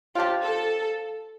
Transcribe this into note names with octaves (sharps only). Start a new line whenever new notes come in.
F3 D4 F4 G4
A4